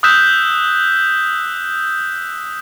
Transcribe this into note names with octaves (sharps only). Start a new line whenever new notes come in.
D#6 E6 F#6 G6 B6 E7